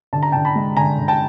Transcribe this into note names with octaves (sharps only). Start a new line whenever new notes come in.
D3 A5
A#5
D3 G5 A5
A5 B5
G#3
D3 G#5 A#5
D3
G5 A5